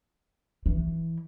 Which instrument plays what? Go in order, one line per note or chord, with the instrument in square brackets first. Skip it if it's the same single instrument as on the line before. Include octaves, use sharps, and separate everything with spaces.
[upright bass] E3